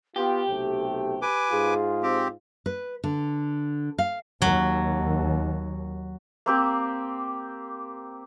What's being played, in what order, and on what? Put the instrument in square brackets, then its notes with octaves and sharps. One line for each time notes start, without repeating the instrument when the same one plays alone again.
[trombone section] B3 F4 [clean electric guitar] G4 [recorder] G5
[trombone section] B1 C3 A3
[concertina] B4 G#5 D6
[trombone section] G#2 F4 [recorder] G#4
[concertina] C4 G4
[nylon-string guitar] B4
D3
F5
[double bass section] D#2 [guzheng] F#3
[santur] A#3 C4 G4